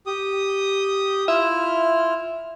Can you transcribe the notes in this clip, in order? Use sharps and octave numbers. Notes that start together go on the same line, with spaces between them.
G4 D#6
E4 F4 E5 F6